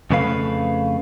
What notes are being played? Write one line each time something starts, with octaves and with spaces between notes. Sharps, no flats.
F2 C#3 A3 B4 F5